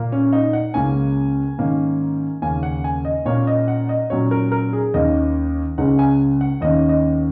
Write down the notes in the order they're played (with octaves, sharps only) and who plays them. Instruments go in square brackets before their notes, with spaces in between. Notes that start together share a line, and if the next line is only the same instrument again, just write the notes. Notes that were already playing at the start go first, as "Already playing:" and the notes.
Already playing: [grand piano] A#2 A#3
C#4
D#4
F#5
C#2 C#3 A#3 C#4 G#5
G#2 D#3 A#3 C#4
D#2 C#3 A#3 C#4 G#5
F#5
G#5
D#5
A#2 A#3 C#4 C#5
D#5
F#5
D#5
A#2 F#3 C#4 C#5
A#4
A#4
G#4
D#2 D#3 A#3 C#4 D#5
C#2 C#3 G#3 C#4 F#5
G#5
F#5
D#2 D#3 A#3 C#4 D#5
D#5